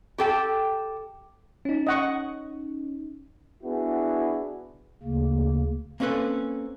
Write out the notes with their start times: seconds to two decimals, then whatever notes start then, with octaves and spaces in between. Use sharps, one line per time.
0.18 G4 A4 G5
1.65 C#4 D#4
1.87 D#5 F#5 C#6
3.63 B3 D4 E4 F#4 G#4
5.03 D2 C#3 A#3
6.00 A#3 C4 C#4 A4 B4